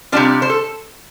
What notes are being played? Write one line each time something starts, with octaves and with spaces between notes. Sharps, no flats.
C3 G3 D4 F4 D5
C5
A4